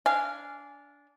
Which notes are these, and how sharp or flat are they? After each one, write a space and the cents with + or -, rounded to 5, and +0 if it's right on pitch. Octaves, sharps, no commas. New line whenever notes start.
D4 -20 F5 -20 G#5 +0